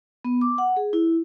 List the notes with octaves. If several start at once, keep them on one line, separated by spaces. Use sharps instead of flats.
B3
D6
F#5
G#4
E4